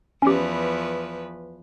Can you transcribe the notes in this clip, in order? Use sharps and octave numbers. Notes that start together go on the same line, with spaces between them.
E2 F3 C#4 G4 B4